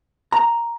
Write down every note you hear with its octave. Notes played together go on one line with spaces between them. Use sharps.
A#5